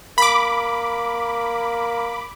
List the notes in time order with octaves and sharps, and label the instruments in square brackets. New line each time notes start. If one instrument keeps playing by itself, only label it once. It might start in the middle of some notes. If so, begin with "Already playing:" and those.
[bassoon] A#3 [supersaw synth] B5 D6